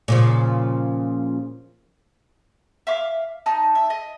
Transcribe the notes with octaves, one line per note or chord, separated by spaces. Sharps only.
A#2 C#3 F3
E5 F5 D6
D#4 A5
E5
D#5